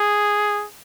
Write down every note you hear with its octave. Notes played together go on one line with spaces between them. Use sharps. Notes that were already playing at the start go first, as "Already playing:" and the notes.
Already playing: G#4